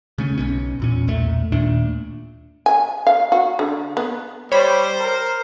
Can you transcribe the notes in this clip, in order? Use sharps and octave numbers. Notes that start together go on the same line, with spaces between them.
C#3 A3 C#4
B1 B2 C#4
E2 A#2 C#4
B1 E2 A#2 A3
D#2 A#2 A3 D4
G#5
F5
F#4
D3
B3
G3 C5 C#5 B5
A#4